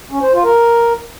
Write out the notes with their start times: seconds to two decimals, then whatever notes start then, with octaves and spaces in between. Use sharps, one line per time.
0.11 C#4
0.22 C5
0.33 F4
0.44 A#4